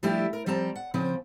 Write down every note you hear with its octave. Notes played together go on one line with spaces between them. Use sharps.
F3 G3 A3 D4 E4 G4
A#4
F3 G3 C4 A5 A#5
F#5
C#3 F3 C4